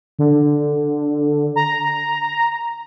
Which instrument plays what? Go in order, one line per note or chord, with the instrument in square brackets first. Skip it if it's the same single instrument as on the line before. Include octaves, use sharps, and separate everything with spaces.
[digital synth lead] D3
A#5